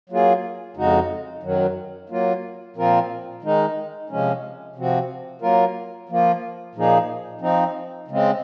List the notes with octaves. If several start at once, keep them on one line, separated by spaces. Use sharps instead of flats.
F#3 A#3 F4 G#4
F2 C#3 G#3 D#4 F#4
F#2 D#3 F#3
F#3 A#3 F4
A#2 F3 C4 F4 A#4
D#3 G#3 D#4
C3 F3 G#3 C#4
C3 F3 C4 F#4
F#3 A#3 F4 A#4
F3 A#3 F4
A#2 F3 A#3 D#4 G#4
F3 C4 D#4
C#3 G#3 C4